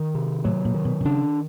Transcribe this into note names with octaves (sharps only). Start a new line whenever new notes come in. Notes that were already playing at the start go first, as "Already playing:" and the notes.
Already playing: D#3
C3
A2 F#3
A#2
D#3
B2
C3
C#3 D4